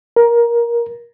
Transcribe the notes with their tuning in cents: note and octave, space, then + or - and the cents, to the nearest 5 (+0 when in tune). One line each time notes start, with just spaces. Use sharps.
A#4 +15